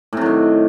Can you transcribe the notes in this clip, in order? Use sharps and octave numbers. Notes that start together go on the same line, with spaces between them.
A2 C3 D#3 F#3